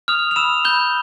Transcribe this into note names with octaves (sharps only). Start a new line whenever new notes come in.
D#6 F6 F7
F7
B5 E6 E7
B5 G6 G7